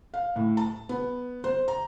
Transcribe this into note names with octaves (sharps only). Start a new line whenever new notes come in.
F5
A2
A5
B3
C5
A#5